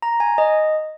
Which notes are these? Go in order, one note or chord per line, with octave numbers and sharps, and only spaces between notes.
A#5
G#5
D#5